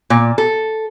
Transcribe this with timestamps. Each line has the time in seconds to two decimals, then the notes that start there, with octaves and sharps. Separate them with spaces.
0.10 A#2
0.38 A4